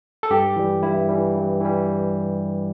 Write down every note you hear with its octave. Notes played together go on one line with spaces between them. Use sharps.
A4
G2 G4
E3 G3
G2 E4
E3 G3
G2
E3 G3